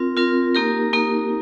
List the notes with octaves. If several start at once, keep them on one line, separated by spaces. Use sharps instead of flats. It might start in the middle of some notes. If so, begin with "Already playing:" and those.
Already playing: C4 F4 A#4
C4 F4 A#4
A#3 D#4 G4 A#4
A#3 D#4 G4 A#4